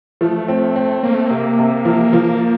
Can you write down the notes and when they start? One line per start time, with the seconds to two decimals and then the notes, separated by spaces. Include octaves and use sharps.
0.21 F3 A3
0.48 C4
0.76 C4
1.03 A#3 C4
1.15 A3
1.26 C3 A#3
1.59 C3
1.85 F3
2.13 F3